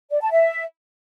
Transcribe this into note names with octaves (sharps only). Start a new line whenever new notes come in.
D5
A5
E5